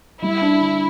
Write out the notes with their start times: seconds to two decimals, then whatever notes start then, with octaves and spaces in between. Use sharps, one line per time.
0.22 G3 E4
0.42 D4
0.61 D3